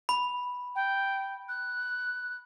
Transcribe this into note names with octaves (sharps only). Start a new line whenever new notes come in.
B5
G5
F#6